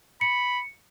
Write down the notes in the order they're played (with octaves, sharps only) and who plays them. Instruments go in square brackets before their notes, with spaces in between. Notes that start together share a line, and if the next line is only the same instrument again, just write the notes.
[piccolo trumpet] B5 [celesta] C#7